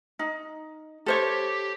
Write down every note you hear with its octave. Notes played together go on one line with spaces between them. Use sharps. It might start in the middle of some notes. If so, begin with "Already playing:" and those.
D#4
G4 A4 C5 C#5